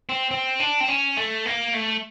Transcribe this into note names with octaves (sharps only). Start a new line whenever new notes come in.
C4
C4
D4
C4
C#4
A3
A#3
A3